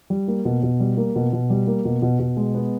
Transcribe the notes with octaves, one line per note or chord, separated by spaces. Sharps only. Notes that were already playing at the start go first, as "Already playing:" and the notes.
G3
A#3
B2
B2
G3
A#3
B2
B2
G3
A#3
B2
B2
B2
G#3
B3